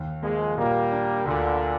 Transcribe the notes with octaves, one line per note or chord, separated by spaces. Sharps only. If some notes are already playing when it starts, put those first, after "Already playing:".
Already playing: D#2
F3 G#3 A#3
A#2 G3 A#3
D4
D2 A#2 D3